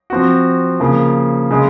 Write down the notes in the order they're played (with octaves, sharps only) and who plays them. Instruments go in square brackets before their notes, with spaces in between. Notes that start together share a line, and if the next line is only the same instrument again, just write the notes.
[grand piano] F3 C4 F#4
C#3 F3 A#3
C#3 G#3